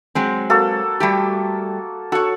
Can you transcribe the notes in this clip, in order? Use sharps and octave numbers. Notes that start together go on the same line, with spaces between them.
F#3 G#3 C4
A#3 F#4 A4
G3 A3 G4
F#4 A4 C#5 F#5